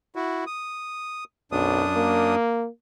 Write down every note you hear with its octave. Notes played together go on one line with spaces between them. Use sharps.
E4 F#4
D#6
B1 F#2 D4 D#6
A#3